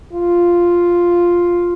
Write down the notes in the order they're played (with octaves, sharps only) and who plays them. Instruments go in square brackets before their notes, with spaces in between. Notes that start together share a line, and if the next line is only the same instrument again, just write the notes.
[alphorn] F4